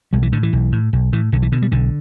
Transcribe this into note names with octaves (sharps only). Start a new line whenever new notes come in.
B1 G3
E3
A2 D3
E3
B1
A2
B1
A2 E3
B1 D3
E3
B2 D3
G3
B1 D3